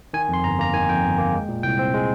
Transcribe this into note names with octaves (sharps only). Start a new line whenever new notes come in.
D#3 G#5
F2
C6
G1 A#5
A#3 A#5
D#3 G#5
F2 G5
G1
A#3
G#3
A#2
C2 G5
C4
G#3